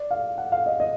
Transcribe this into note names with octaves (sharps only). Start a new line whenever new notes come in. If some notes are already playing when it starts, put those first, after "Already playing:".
Already playing: D5
F5
F#5
F5
D#5
D#5